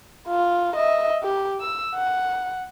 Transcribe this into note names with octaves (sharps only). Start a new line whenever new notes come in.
F4
D#5 E5
G4
E6
F#5